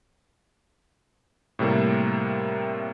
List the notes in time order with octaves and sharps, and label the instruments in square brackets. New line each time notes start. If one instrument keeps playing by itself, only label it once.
[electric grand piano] A2 C3 G3 A#3